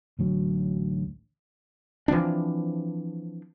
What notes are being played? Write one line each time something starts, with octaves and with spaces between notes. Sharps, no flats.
A1 D2 F#3
E3 F3 C4 D4